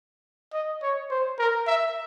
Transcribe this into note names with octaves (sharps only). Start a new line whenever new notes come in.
D#5
C#5
C5
A#4
E5